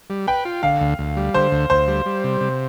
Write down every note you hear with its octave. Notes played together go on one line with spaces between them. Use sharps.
G3
B4 G5
F4
D3 F5
D2
D2
G3
D3 C5
D2
D2 C5
G3
G3
C3
C3